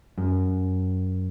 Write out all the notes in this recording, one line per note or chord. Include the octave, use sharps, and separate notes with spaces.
F#2